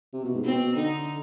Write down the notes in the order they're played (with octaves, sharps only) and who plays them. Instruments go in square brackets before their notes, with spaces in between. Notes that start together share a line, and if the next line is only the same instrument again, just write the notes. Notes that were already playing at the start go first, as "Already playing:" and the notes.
[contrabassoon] C3
B2
G#2
[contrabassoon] B2 [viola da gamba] C4
[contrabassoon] B2
[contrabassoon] D3 [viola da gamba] D#4